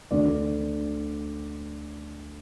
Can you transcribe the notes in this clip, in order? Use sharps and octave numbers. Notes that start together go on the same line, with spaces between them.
D2 D3 D5